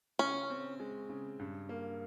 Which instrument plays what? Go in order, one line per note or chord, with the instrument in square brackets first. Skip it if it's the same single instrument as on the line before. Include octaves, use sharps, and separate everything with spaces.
[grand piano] C#3 [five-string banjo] C#4
[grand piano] C4
G#3
C#3
G2
A#3